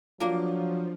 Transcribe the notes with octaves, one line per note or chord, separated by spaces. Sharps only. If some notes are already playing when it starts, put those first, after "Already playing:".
F3 F#3 A#3 D4 F4 A#4